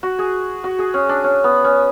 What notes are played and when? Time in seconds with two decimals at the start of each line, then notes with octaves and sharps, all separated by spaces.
0.03 F#4
0.19 G#4
0.64 F#4
0.79 G#4
0.94 C#4
1.09 D4
1.24 C#4
1.44 B3
1.64 C#4